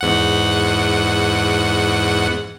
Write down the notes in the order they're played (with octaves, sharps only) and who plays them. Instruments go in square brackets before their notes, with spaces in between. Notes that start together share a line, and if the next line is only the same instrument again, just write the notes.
[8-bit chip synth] E2 G#2 F#5